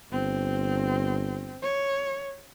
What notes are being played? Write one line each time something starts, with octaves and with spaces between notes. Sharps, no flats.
G1 C4
C#5